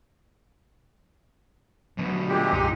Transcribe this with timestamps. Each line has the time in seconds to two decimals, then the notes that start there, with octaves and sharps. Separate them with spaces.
1.98 D2 B2 F#3
2.29 A#2 G#3 G4
2.53 C2 F#2 D#4